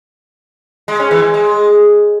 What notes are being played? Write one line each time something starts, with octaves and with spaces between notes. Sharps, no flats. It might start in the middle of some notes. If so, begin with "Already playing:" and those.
G#3
C#4
E3
G#3
G#3